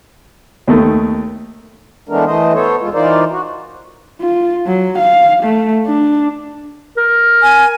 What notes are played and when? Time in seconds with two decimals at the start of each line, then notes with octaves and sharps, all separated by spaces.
0.68 D#2 D#3 A3
2.09 E3 G#3 A3 B3 D4 A#4
2.25 E3 A3 C5 D#5
2.53 B3 A4 C5 C#5
2.81 E2 G#3 F4
2.94 E3 D#4 F4 A#4 C5 D5
3.30 F#4
4.21 F4
4.67 F#3
4.98 F5
5.44 A3
5.87 D4
6.97 A#4
7.42 G#5